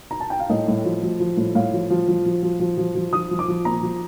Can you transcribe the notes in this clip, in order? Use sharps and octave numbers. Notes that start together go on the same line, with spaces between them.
A#5
A5
G5
F5
A2 D#5
A2
F3
F3
F3
A2
A2 F5
F3
F3
F3
F3
F3
F3
F3
F3
F3 D#6
F3
D6
F3
A#2 A#5
F3